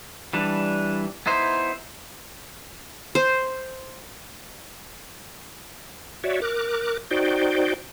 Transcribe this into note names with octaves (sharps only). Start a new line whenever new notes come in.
E3 G3 D4
B3 D#4 E4 C5
C5
F#4 C#5 D5 E5
A#4 D6 F#6
D#4 F#4 C5 D5 G5